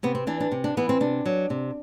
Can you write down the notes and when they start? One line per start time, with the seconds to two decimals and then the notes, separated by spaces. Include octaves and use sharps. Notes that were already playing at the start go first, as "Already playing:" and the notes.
0.03 C3 B3
0.15 C4
0.27 E3 D4
0.40 D4
0.52 C3
0.64 D4
0.77 E3 B3
0.89 C4
1.00 C3 D4
1.26 F#3
1.50 C3